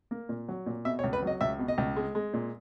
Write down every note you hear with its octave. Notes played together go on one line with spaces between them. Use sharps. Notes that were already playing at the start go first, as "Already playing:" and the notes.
A#3
A#2
F#3
A#2
B2 E5
C#5
C#2
B4
F#3 D#5
C#2 E5
B2
D#5
C#2
G#3
G#3
A#2